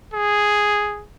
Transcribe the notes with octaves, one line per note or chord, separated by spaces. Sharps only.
G#4